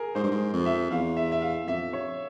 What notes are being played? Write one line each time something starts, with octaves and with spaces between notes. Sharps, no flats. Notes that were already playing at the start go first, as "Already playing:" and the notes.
Already playing: G#4 A#4
G#2 C5
G2
G#2
F2
E5
E2 F5
E5
E5
F5
F2 E5
C#5